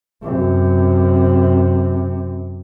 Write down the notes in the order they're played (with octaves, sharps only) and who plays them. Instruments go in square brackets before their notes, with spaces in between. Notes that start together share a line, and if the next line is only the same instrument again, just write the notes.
[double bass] F#2 C3